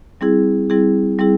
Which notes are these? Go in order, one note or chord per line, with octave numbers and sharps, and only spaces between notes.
G3 C4 E4 G#4
G3 C4 E4 G#4
G3 C4 E4 G#4